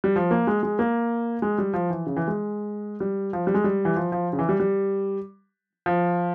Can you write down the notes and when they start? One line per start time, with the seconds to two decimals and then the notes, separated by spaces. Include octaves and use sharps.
0.04 G3
0.16 F3
0.31 A#3
0.47 G#3
0.63 G#3
0.79 A#3
1.42 G#3
1.58 G3
1.74 F3
1.90 E3
2.06 C#3
2.16 E3
2.28 G#3
3.00 G3
3.33 F3
3.47 G3
3.54 G#3
3.64 G3
3.85 E3
3.96 F3
4.12 F3
4.33 C#3
4.39 E3
4.49 G3
4.60 G3
5.86 F3